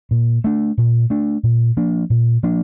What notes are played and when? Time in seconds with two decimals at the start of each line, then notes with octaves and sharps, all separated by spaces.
0.11 A#2
0.44 A3 D4
0.78 A#2
1.10 A3 D4
1.43 A#2
1.77 F3 A#3 D4
2.10 A#2
2.43 F3 A#3 D4